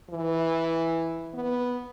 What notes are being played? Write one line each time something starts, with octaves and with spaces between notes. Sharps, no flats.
E3
B3